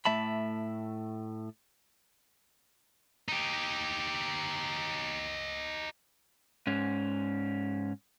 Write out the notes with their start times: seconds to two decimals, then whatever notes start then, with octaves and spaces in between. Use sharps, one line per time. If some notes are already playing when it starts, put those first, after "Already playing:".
0.05 A2 A3 E5 A5 B5
3.28 D#4 G4
6.67 G#2 C#4